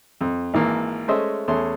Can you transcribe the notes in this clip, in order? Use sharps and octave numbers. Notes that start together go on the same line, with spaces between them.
F2
G#1 E3 A#3
G#3 A3 C#4 C5 D#5 E5
E2 A3 C#4 C6